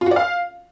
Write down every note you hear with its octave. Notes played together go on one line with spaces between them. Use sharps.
F4
F#4
D5
F5